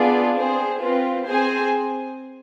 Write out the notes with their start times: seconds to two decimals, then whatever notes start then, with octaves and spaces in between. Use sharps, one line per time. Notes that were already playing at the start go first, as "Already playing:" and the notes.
Already playing: B3 D4 F4 G#4 D5
0.36 C4 G#4 C5
0.81 C4 F4 B4
1.26 C4 G#4 C5 G#5